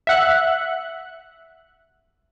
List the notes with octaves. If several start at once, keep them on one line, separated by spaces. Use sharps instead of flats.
E5 F#5 F#6